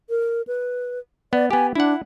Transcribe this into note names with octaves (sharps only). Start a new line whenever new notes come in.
A#4
B4
B3 D5
B3 G4 G#5
D4 E4 F#5